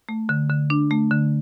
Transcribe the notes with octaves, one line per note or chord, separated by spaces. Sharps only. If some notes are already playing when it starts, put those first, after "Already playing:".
A3
D3
D3
D4
A3
D3